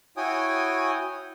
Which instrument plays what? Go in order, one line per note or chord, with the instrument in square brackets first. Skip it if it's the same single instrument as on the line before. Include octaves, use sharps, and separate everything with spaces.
[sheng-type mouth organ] E4 F#4 C#5 G5 G#5 D#6